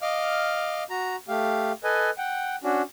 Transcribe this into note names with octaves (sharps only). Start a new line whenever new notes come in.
D#5 F5 D6 F6
F#4 A#5
A3 G4 F5
A4 B4 D#5 G#5
F#5 G5
C#4 D4 F#4